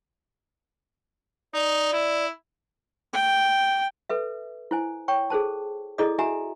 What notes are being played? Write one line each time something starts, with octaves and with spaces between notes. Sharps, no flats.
D#4 D5
E4
G5
A4 B4 E5
E4 C5 G#5
C#5 G5 C#6
G#4 A4 C5 A5
E4 G#4 A4 D5 D#5 D#6
E4 F#4 E5 G#5 A#5